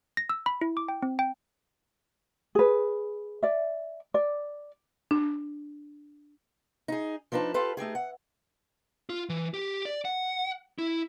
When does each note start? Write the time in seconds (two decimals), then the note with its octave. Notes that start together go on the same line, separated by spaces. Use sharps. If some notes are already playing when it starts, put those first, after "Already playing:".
0.17 A#6
0.30 E6
0.46 B5
0.61 E4
0.77 D6
0.88 G5
1.02 C4
1.19 G5
2.55 G#4 B4
3.43 D5 E5
4.14 D5
5.11 D4
6.88 D#4 G#4
7.32 F3 D4 D#4 B4 A5
7.54 F4 G4 A4 B4
7.77 A3 D#4 G4 G#4
7.95 F#5
9.09 F4
9.29 E3
9.54 G4
9.85 D5
10.05 F#5
10.79 E4